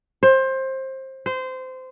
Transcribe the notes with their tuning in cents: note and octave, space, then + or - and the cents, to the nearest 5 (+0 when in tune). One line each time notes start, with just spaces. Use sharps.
C5 +20
C5 -20